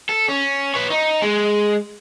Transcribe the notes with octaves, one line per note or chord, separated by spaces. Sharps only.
A4
C#4
B4 C#5
D#4
G#3